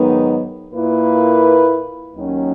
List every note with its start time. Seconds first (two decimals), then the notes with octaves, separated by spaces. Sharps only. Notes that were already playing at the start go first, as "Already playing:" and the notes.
Already playing: G#2 D#3 F#3 B3 D#4
0.74 A#2 A#3 E4 B4
2.15 D#2 D#3 F#3 C#4